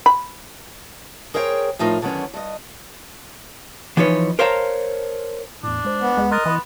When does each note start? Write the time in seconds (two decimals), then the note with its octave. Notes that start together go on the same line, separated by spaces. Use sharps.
0.06 B5
1.34 G#4 A#4 C5 C#5 G5
1.79 A2 F3 D#4 F4 A#4
2.02 D3 D#3 F#3 B3 C#4
2.34 G2 D#5
3.97 E3 F3 D#4 B4 C#5
4.39 A#4 C5 C#5 F5 A5 A#5
5.63 E2 A2 D4
5.85 G#3 C5
6.01 B3
6.17 C#2 G#3
6.31 A#4 D#5 C6 F#6 A6
6.46 E3 B3